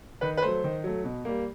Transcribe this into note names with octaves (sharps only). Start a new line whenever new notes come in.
D#3 B4
B4
F#3 A3 C5
D#3
F#3 A3
B2
G3 A#3